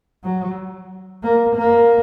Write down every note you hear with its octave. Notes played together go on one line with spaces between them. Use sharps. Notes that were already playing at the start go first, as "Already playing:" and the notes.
F#3
A#3
A#3